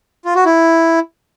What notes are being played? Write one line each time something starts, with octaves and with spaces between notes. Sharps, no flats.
F4
F#4
E4